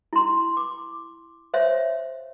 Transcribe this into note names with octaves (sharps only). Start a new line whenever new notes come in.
E4 C6
D6
C5 C#5 E5 F5